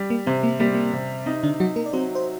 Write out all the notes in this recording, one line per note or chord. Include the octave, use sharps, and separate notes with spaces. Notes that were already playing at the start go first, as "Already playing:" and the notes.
Already playing: G3
A#3
C3 C4
A#3
G3 A#3
A#3
C3
C4 D#4
D3 D4
F#3 D#4 F#4
A#3 A#4
D5
F#3 C4 C5
C5